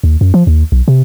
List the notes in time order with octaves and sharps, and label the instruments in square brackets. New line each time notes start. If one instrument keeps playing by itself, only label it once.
[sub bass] D#2
F#2
F3
D#2
B1
C3